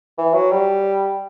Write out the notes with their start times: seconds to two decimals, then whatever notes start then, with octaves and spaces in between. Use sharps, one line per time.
0.18 E3
0.34 F#3
0.51 G3